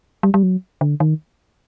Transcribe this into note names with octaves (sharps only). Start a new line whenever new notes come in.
G3
G3
F#3
D3
D#3